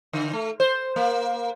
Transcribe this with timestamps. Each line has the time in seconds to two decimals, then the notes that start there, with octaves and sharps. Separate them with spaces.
0.13 D3
0.33 A3
0.60 C5
0.96 A#3